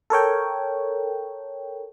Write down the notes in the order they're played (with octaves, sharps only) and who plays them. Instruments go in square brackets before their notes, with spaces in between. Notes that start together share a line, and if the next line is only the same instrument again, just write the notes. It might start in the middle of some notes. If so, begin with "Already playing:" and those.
[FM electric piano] A4 A#4 C#5 G5